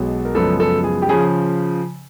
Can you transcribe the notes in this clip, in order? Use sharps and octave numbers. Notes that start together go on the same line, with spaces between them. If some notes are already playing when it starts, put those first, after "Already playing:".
Already playing: B1 B2 G#3
A#4
F#2 C#3 F3 G#3 B3 A4
A4
G#4
G4
C#3 F3 G#4